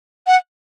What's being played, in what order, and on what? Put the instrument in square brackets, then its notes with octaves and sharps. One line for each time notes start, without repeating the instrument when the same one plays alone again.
[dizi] F#5